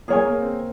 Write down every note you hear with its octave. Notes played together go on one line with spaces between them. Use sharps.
A#3 G#4 C#5 G#5
A#3
C4